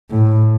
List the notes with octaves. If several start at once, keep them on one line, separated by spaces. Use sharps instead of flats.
A2